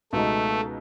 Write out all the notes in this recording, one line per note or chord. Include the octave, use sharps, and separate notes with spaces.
C#2 B2 G#3 A3 D#4